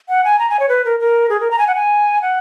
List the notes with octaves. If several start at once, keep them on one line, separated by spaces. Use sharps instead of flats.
F#5
G#5
A#5
G#5
C#5
B4
A#4
A#4
G#4
A#4
A#5
G#5
F#5
G#5
F#5